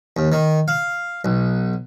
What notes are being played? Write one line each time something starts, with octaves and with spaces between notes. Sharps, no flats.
D#2
D#3
F5
B1